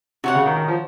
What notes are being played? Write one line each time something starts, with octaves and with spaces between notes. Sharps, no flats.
C3 F#4 C#5 F#5
C#3
D#3
D#3
F3